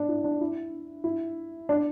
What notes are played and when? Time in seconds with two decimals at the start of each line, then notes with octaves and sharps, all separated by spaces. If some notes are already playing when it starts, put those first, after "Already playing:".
Already playing: D4
0.08 E4
0.24 D4
0.41 E4
1.04 E4
1.69 D4